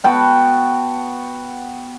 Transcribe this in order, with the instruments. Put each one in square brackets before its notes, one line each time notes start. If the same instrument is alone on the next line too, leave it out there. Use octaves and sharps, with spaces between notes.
[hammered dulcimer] B3 F#4 G5 A5